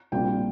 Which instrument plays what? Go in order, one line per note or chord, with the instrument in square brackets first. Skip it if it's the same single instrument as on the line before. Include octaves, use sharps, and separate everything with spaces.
[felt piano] A#1 A#2 G3 C4 G5